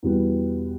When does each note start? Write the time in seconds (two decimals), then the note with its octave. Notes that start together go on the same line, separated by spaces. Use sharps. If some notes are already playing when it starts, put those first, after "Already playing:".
0.03 E2 B2 G3 B3